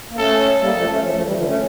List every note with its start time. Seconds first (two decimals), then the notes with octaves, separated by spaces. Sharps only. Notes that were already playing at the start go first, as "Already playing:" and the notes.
0.11 A#3
0.18 A3 C#4 A4
0.60 G3 A#3 A4
0.75 F3 A3
0.89 A3 C#4
1.04 F3 A3
1.15 F3 A3
1.25 E3 G3
1.36 D3 F3
1.46 A3 C#4